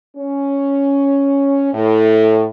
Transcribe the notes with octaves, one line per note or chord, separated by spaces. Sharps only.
C#4
A2